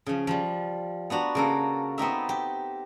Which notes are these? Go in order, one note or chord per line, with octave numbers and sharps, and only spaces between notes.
C#3 F3
F3 G3
B3 D4 F#4 A#5
C#3 A#3 A4
B3 C4 D#4 E5
G4